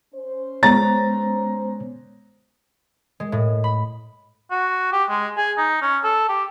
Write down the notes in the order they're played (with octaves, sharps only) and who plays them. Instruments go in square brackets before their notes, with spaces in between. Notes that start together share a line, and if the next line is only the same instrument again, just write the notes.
[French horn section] C#4 C5
[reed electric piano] G#3 B3 C#5 [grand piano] A#5 A6
[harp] G#3
A2
B5
[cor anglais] F#4
G4
G#3
G#4
D#4
C#4
A4
G4